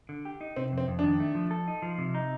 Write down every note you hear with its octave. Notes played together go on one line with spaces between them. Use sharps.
D3
G4
D#4
C3 C4
F2
C4
F2
D#3 D4
A3
F3
A4
D#4
F3
C3
D#4